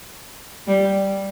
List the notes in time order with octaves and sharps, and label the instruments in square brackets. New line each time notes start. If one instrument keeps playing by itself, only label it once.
[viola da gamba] G3